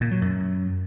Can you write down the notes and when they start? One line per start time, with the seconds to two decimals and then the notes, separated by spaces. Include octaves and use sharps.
0.01 A#2
0.11 F#3
0.21 F#2